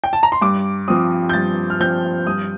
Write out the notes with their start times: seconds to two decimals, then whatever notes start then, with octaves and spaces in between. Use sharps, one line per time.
0.04 G5
0.13 A5
0.23 A#5
0.32 C6
0.41 G2 D6
0.88 F3 C4 D#6
1.29 G6
1.33 G2 A6
1.70 F6
1.80 F3 C4 G6
2.27 G2 D#6